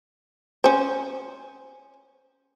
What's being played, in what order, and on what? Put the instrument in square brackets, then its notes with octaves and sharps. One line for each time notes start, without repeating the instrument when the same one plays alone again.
[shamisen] C#4 C5